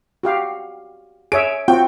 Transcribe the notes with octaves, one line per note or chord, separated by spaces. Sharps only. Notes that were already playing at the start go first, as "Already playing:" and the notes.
F#4 G4 F5
G#4 C#5 E5 D7
C4 F4 F#4 G5